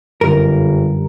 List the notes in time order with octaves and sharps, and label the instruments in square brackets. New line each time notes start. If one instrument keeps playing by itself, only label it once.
[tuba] G1 [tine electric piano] F#2 D3 G3 [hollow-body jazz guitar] A#4